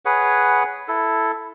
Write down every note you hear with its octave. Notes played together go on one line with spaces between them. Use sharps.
G#4 B4 C#5 F#5
E4 A4